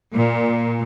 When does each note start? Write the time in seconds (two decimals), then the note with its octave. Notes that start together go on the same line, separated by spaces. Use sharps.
0.14 A#2